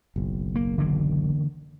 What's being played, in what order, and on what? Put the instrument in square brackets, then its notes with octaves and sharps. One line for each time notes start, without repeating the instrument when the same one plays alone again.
[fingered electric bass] F#1 B1
[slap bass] A#3
D3 E3 A#3